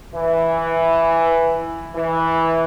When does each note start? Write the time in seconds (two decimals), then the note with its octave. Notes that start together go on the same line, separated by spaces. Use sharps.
0.14 E3
1.95 E3